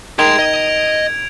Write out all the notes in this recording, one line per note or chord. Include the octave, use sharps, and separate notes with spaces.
D#3 G#4 C6 G#6 D7 F7
D#5